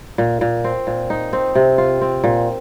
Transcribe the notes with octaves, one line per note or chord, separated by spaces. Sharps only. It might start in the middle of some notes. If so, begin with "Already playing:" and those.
A#2
A#2
C4
A#2
D#4
C4
C3
F4
C4
A#2